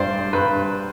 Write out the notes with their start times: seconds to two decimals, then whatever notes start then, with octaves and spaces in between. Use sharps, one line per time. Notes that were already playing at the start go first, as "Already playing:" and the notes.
Already playing: G2 C5 D5
0.33 G2 B4